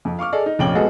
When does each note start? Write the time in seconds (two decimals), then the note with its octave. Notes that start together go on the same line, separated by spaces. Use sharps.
0.05 F2
0.19 F5 C#6 D6 F6
0.33 G#4 A4 D5 D#5
0.46 D#4
0.59 F1 A#1 C#4 G5 D6 F#7
0.75 G#3 B3 F#4 G#4 A4 D#5